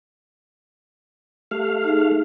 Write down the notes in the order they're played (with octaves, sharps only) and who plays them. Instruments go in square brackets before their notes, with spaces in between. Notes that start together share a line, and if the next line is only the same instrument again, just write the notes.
[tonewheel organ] A3 F5 [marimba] G4
[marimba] D#4 G#4